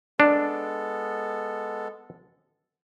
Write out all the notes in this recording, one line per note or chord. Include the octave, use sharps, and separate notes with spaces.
G#3 B3 D4 A4